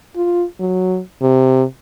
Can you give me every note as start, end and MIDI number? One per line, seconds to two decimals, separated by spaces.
0.16 0.45 65
0.60 1.00 54
1.22 1.64 48